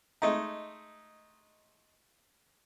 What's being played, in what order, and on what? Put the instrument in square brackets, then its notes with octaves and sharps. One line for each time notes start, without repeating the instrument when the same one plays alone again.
[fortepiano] G#3 A3 D#4